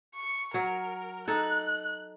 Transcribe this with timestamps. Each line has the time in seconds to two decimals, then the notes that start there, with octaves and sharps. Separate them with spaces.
0.15 C#6
0.54 F#3 A#4
1.28 D#4 A4 F#6